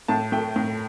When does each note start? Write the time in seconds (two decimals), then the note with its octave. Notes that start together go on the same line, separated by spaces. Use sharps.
0.08 A2 A5
0.32 A3 G5
0.56 A2